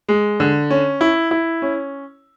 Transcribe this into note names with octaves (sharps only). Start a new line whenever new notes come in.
G#3
D3
C#4
E4
E4
C#4